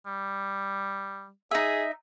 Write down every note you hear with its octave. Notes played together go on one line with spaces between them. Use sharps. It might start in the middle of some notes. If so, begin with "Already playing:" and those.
G3
D#4 G#4 E5